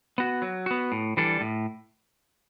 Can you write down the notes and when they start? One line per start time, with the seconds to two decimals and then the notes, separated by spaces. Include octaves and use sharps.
0.18 B3 F#4
0.42 F#3
0.66 B3 F#4
0.92 A2
1.17 E3 G3 D4 A4
1.41 A2